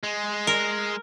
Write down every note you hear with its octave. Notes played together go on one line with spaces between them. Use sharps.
G#3
A#4